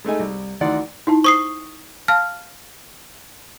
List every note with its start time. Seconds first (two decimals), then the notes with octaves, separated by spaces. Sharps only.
0.04 G#3 A3 D#4 G#5
0.19 C2
0.61 D2 D#3 E3 D5 F#5 C6
1.07 D#4 E4 A5
1.24 C5 C#6 D#6 C7
2.08 F5 A5 F6